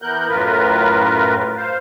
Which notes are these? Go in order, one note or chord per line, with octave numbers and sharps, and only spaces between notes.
E3 B3 A#4 F#6 G6
F#2 A2 F4 A#4 B4
C5 F5